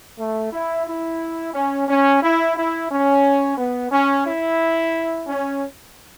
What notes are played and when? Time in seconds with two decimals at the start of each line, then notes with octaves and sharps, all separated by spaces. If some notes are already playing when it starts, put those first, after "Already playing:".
0.19 A3
0.52 E4
0.86 E4
1.54 C#4
1.88 C#4
2.23 E4
2.56 E4
2.90 C#4
3.58 B3
3.92 C#4
4.26 E4
5.27 C#4